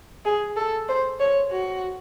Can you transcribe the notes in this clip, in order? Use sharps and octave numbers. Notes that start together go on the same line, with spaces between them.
G#4
A4
C5
C#5
F#4